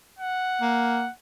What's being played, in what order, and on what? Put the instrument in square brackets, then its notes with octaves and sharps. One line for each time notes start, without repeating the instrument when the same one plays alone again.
[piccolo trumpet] F#5
[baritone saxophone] A#3